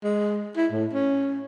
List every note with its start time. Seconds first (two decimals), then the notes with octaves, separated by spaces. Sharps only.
0.04 G#3
0.56 E4
0.72 A2
0.93 C#4